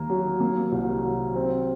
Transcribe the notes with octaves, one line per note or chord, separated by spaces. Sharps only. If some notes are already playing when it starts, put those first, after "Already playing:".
Already playing: D#2 A#3
F#3
A#3
C2
F#3
C4